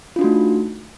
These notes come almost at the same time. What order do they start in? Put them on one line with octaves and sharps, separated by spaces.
F4 D4 F#4 A3 D#4